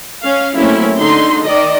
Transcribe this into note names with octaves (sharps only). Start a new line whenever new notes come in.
C#4 F5
F#3 A3 A#3 C4 C#4 E4
D3 D#4 C6
D#3 D5 D#5